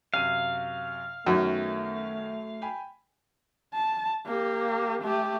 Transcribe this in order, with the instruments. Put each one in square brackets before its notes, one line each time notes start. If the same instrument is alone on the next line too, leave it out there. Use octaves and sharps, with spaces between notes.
[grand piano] F#2 C3 D#7 [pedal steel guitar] F5
[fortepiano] F#2 [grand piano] D#3 B3 C#4 [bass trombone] A3
[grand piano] G5 G#5 B5
[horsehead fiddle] A5
A#3 G4
A3 G4